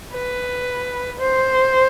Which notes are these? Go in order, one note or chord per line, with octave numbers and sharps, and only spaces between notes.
B4
C5